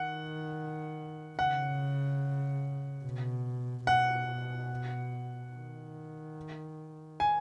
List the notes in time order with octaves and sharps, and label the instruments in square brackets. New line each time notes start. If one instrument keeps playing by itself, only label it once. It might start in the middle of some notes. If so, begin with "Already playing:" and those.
Already playing: [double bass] D#3 [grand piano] F#5
[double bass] C#3 [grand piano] F#5
[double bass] B2
[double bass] B2 [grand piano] F#5
[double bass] D#3
[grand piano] G#5